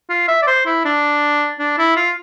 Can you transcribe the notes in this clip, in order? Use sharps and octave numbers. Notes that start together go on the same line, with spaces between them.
F4
E5
D5
C5
E4
D4
D4
E4
F4